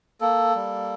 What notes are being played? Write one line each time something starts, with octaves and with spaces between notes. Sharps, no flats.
A#3 A4
G3